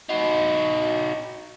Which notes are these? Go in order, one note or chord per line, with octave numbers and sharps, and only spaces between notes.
D#4 F#4